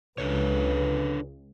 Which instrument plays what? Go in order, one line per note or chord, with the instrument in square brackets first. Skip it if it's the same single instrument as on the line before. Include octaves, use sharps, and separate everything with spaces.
[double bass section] C#2 [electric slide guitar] D4 A4 C#5 [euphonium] B4